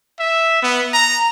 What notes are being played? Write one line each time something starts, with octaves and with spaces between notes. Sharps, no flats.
E5
B3
A#5